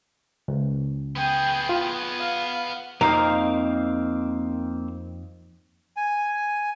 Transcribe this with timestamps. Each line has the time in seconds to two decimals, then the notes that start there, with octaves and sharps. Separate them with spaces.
0.48 C#2
1.16 B3 G#4 G5
1.69 F4
2.19 F5
3.01 F2 A#3 C4 D#4 F5
5.97 G#5